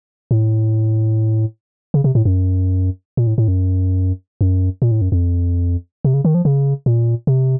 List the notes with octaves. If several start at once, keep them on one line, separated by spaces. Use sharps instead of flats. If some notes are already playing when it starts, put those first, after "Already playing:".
A2
C#3
C3
A2
F#2
A#2
A2
A2
F#2
F#2
A#2
A2
F#2
F2
C3
C#3
D#3
F3
C#3
A#2
C3